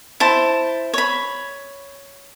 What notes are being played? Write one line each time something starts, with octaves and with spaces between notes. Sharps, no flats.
E4 C5 A5
C#5 B5